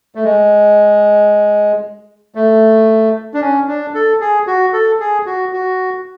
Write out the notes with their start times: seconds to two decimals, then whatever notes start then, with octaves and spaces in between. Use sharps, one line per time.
0.15 A3
0.24 G#3
2.35 A3
3.34 D4
3.41 C#4
3.68 D4
3.94 A4
4.21 G#4
4.47 F#4
4.73 A4
5.00 G#4
5.26 F#4
5.53 F#4